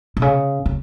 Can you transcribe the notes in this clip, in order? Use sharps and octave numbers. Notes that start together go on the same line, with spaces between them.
B2
C#3
C#3